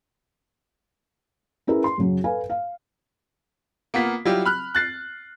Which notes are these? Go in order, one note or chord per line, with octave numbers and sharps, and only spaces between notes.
C#4 E4 G#4 A#4 B4
C6
F#2 C#3 F#3
A4 B4 F5 G#5
F5
A#3 B3 F4 B6
F#3 G3 E4 F4 G4
B5 F6 F#6
F#6 A6 C7